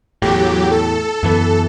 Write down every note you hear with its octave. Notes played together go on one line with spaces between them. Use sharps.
E2 A2 F#3 G4
A4
F#2 E3 B3